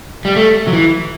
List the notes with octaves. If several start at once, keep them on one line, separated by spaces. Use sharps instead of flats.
G3
A3
F#3
E3